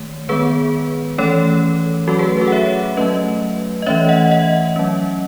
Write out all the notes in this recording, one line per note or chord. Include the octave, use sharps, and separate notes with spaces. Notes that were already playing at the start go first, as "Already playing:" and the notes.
Already playing: D#3 A3 C#5
D#3 G#3 B3 G#4 B4
E3 A3 C#4 A4 C#5
F#3 A3 C#4 F#4 A4
G#4 B4
B4
F#4 A4
F#5
C#5 E5
F#3 A3 C#4 B4 D#5
D#5
E3 A3 C#4 C#5 E5
D#5 F#5
D#5 F#5
F#3 C#4